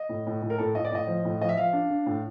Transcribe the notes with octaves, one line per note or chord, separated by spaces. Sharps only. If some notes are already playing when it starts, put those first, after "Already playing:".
Already playing: D#5
A2
A2
A2
A#4
A2 A4
A2 D#5
D5
A2 D#5
F3
A2
F3 D#5
E5
F3 F5
D4
D4
A2